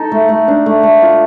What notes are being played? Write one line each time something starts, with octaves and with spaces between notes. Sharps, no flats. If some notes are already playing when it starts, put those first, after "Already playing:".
Already playing: D#4 A4
A3
A3
D4
A3
A3
F4